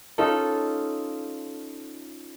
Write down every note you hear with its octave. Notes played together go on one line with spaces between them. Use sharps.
C#4 D#4 F4 A4